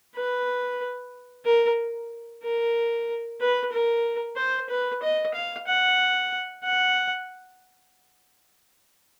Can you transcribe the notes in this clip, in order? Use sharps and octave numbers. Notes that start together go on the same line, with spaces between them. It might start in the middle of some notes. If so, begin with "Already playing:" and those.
B4
A#4
A#4
B4
A#4
C5
B4
D#5
F5
F#5
F#5